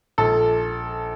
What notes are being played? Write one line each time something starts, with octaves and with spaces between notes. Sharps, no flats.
A#1 A4